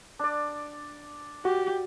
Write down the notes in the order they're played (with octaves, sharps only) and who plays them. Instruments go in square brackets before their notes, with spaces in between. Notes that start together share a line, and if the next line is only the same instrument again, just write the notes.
[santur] D4 D5
[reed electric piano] F#4 [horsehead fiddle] G4